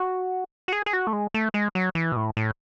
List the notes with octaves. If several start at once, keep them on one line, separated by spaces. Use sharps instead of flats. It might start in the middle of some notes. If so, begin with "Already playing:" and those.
Already playing: F#4
F#4
G#4
G#4
F#4
A3
G#3
A3
G#3
F#3
E3
B2
A2
A2